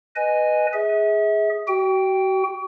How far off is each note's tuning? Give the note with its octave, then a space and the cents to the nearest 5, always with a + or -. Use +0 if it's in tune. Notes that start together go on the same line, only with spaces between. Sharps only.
B4 +0 D#5 -10 G#5 +0
G#4 +0 E5 -35
F#4 +35 G5 +0